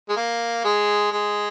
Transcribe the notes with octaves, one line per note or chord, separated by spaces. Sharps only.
G#3
A#3
G#3
G#3